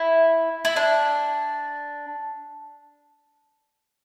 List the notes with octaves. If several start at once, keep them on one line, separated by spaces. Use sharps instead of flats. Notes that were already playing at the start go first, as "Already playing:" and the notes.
Already playing: E4
E4
D4